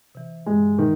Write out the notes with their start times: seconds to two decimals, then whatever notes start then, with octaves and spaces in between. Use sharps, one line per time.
0.15 C3 E3
0.46 G2 G#3
0.78 D#3 E3